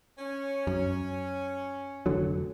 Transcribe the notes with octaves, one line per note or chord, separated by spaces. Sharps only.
C#4
F#2
F1 D3 F#3